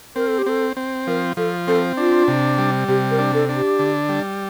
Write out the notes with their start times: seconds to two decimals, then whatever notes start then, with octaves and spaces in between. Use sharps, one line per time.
0.16 C4 A#4
0.27 A4
0.38 G4
0.46 C4 A4
0.77 C4
1.07 F3 A#4
1.37 F3 A4
1.68 C4 A4
1.97 D4 F4
2.28 C3
2.58 G3
2.88 C3 G4
3.11 A#4
3.18 D4
3.34 A4
3.49 D4
3.56 G4
3.79 D3
4.09 G3